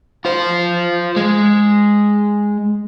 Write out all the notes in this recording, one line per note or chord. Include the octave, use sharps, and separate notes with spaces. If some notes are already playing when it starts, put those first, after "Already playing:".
F4 C5
G#3